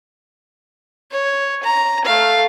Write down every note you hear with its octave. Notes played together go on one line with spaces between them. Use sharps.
C#5
A#5
A3 F5